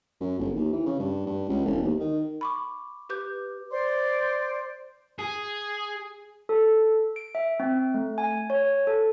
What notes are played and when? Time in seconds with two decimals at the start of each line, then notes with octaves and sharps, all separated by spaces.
0.21 F#2
0.39 G1
0.55 D#2
0.73 E3
0.86 C#3
0.99 G2
1.26 G2
1.48 C#2
1.65 E1
1.82 D#2
2.00 D#3
2.41 B5 C#6 D6
3.09 G4 B4 D6 G6
3.70 C5 D5 C6
5.19 G#4
6.49 A4
7.16 D7
7.35 E5
7.60 C4
7.94 A3
8.18 G#5
8.50 C#5
8.87 A4